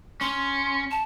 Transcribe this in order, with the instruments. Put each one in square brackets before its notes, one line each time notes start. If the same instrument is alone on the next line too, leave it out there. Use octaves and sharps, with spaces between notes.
[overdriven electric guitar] C#4 [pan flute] C6
[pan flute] A5